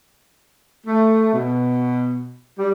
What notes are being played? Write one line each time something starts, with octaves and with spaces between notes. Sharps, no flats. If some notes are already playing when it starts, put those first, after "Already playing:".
A3
B2
G3